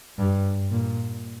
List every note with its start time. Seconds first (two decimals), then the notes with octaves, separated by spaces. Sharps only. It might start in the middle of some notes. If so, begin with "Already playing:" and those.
0.19 G2
0.71 A#2